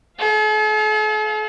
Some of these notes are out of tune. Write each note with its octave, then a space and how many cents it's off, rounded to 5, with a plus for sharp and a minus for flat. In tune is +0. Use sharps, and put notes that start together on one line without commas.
A4 -45 F5 +0